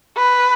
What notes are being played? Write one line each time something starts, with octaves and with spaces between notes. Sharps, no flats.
B4